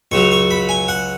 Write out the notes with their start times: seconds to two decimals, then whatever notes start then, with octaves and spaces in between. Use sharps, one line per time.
0.12 C#2 C#3 F#3 C#6
0.32 C#6
0.51 B5
0.69 G#5
0.88 F#5